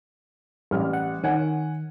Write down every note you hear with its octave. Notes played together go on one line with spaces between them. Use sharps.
A1 G3 F6
F#5
D#3 C#5 F#5 G#5